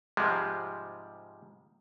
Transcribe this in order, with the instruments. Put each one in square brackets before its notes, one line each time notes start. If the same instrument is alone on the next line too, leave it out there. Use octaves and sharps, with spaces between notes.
[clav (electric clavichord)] G#2 C3 F3 G3 G#3